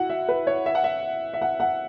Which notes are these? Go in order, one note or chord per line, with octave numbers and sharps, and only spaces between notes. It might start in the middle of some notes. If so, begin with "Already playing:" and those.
Already playing: E4 F#4 F#5
E5
B4
C#5
E5
F#5
E5
E5
F#5
F#5